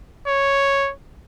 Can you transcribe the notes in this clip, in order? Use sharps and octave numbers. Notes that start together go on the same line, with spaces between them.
C#5